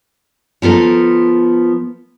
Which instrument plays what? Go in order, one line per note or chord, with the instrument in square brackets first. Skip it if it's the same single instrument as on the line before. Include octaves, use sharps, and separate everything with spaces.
[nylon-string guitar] F3 B3 A4 A#4